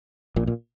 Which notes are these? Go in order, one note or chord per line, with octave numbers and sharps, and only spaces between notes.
A#1 A#2
A#2